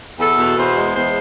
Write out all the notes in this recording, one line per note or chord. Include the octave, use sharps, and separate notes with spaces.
E2 A4
B2
E2 C5
G#3
E2 C5